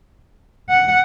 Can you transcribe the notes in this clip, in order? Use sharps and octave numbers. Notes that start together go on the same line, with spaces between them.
F#5